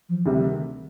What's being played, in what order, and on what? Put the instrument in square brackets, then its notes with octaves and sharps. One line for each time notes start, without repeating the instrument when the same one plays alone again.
[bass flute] F3
[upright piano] D2 C3 G3 [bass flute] D#3